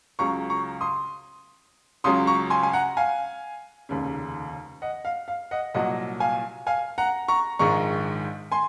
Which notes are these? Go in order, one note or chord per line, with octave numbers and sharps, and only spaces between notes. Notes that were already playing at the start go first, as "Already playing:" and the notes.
C#2 C#3 F#3 A#5 C#6
A#5 C#6
C6 D#6
C#2 C#3 F#3 C6 D#6
A#5 C#6
G#5 C6
G#5
F#5 A#5
F5 G#5
F1 D#2 C#3
D#5 F#5
F5
F5
D#5 F#5
C2 A#2 F#3 D#5 F#5
F5 G#5
F5 G#5
F#5 A#5
A#5 C#6
A#1 G#2 D#3 G#3 A#5 C#6
G#5 C6